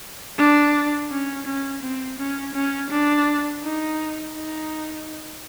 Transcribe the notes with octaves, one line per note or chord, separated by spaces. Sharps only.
D4
C#4
C#4
C4
C#4
C#4
D4
D#4
D#4